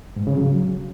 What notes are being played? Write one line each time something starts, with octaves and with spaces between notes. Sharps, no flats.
G#2
C#3
F#3